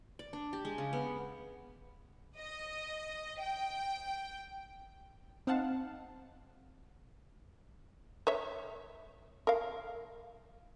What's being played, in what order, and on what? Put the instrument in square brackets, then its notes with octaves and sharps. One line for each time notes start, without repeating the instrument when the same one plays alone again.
[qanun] D5
D4
G4
G#3
C#3
B3
[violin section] D#5
G5
[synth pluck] C4 D#4 F5 F#5 A5
[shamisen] B4 C#5 E5
A#4 F5